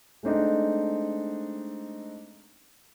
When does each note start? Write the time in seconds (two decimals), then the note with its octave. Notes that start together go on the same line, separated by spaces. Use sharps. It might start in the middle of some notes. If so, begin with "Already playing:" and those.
0.23 G#3 A3 C4 D4 D#4